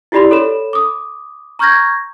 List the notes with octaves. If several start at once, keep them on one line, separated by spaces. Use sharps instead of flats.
E4 F4 G4 D5 B5 C6
A4 C#5 B5 E7
D6 D#6
A#5 C#6 F6 G6 G#6 A#6